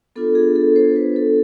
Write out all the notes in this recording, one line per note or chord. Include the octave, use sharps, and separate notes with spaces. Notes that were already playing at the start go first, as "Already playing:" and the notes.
B3 D4 F4 A4
G#4
A4
C5
B4
A4